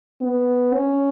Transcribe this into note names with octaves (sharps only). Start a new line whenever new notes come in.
B3
C#4